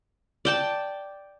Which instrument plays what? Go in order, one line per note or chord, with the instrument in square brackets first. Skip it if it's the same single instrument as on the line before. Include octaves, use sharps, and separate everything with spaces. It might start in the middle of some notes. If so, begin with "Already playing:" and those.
[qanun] D5 G5 A5